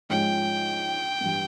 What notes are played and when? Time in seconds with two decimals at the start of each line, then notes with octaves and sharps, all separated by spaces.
0.10 G#2 F3 G#3 C#4 F4 G5
1.21 G2 E3 G3